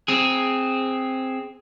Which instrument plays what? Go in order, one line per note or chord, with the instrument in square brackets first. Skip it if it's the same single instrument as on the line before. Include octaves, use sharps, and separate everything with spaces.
[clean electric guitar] C4 G#4